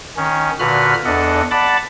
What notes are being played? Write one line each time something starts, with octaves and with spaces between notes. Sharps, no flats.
D#3 C#4
A#2 D3 F#4 B4 B5 F6
E2 D4 A4 D#5 F#5
D5 F#5 A5 B5 D6